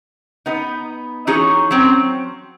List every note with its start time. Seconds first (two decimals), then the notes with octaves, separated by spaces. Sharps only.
0.46 B3 D#4
1.27 E3 D#4 F#4 G#4 C#5
1.71 F#3 C4 C#4